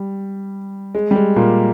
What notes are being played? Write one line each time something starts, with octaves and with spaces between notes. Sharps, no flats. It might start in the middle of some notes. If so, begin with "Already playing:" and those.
Already playing: G3
G#3
G3
G#3
A#2 A#3